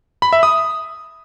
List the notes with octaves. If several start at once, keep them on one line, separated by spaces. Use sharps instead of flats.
B5
E5
D#6